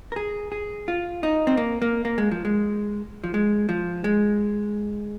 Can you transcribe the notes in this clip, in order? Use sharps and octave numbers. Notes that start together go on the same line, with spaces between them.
A#4
G#4
G#4
F4
D#4
C4
A#3
A#3
A#3
G#3
F3
G#3
F3
G#3
F3
G#3